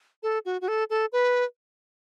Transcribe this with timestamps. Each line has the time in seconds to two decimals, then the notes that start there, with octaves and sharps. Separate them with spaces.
0.23 A4
0.45 F#4
0.61 F#4
0.68 A4
0.90 A4
1.12 B4